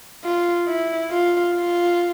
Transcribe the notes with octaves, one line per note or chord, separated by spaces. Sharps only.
F4
E4
F4
F4